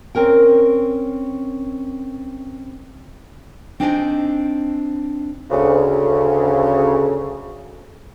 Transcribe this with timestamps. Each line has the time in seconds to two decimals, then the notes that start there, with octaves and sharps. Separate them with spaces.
0.15 C4 C#4 A#4 G5
3.80 C4 D4 D#4 C5 D#5 G#5
5.51 D2 C#3